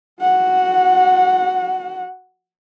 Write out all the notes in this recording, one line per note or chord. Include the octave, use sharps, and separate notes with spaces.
F#4 F#5